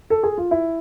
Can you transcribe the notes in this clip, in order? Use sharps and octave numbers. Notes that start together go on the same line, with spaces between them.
A4
G#4
F4
E4